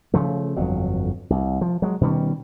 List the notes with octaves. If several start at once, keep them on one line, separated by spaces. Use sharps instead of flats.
C#3 F3 A3
G1 F2 F#3
C2
F3
F#3 G#3
B2 D#3 G3 C#4